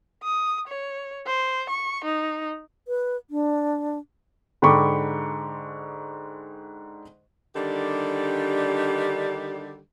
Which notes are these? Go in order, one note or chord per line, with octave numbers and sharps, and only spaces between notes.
D#6
C#5
C5
C#6
D#4
B4
D4
G#2 D3 G5 B5 C#6 D6
D3 D#3 G3 D4 G4